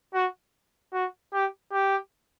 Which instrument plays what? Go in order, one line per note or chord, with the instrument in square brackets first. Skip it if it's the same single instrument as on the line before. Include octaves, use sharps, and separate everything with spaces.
[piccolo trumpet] F#4
F#4
G4
G4